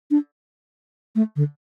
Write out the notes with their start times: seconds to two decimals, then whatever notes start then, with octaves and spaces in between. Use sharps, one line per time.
0.11 D4
1.15 A3
1.36 D3